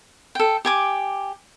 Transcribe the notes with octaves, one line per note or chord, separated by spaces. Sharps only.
A4 G5
G4 G#5 D6